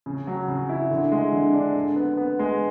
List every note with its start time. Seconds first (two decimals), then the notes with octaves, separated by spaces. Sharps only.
0.06 C#3
0.27 F#3
0.48 C#3
0.69 E4
0.91 D3
1.12 G#3
1.32 D3
1.54 D4
1.76 D3
1.96 B3
2.17 B3
2.39 G#3